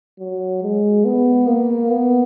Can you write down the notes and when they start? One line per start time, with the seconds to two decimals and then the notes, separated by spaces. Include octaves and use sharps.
0.19 F#3
0.63 G#3
1.05 B3
1.47 A#3
1.90 B3